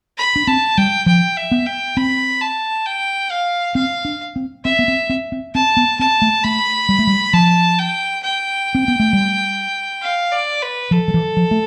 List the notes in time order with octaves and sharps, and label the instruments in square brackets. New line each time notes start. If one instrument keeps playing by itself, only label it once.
[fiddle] B5
[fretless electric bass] D4
[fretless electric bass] C4 [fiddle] A5
[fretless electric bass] G3 [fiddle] G5
[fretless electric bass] F3 [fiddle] G5
[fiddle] E5
[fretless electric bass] B3
[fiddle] G5
[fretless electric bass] C4 [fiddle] B5
[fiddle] A5
G5
F5
[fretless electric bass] C4 [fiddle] F5
[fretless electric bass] D4
C4
[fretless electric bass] C4 [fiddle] E5
[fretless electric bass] B3
C4
C4
C4
[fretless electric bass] C4 [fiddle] A5
[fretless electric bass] B3
[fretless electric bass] C4 [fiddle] A5
[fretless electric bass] A3
[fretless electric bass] A3 [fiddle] B5
[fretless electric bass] G3
A3
G3
[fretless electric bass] F3 [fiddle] A5
[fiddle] G5
G5
[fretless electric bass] C4
B3
A3
G3
[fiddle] F5
D5
B4
[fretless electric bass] F3 [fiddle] A4
[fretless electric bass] F3
E3
F3
A3